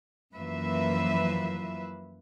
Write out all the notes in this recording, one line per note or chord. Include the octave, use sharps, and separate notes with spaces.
F#2 E3 F3 A#3 B4 E5